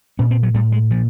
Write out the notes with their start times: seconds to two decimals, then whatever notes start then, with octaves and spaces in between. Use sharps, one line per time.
0.19 A#2 C#4
0.31 C4
0.43 F#3
0.54 A2 G3
0.72 G#3
0.90 A#2 F3